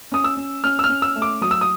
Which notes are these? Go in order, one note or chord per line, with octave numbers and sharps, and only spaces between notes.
C#4 D#6
E6
C#4
C#4 F6
E6
F6
C#4
E6
A3
D6
F#3 D#6
E6
D#6